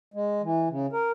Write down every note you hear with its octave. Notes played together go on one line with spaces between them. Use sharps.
G#3
E3
C#3
A#4